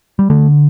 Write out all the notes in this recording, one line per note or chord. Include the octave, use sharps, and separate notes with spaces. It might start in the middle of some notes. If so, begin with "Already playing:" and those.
G3
D3 A3